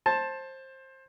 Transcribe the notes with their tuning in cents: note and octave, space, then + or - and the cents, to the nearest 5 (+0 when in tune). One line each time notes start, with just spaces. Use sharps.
C5 +20 A5 +0